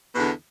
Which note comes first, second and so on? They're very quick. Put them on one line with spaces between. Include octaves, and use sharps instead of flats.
B2 E2 D3